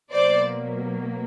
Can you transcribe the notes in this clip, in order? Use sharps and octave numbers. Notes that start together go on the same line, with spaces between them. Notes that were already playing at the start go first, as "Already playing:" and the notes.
B2 F#3 A#3 C5 D5